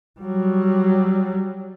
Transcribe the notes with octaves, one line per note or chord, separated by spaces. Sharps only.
F#3 G3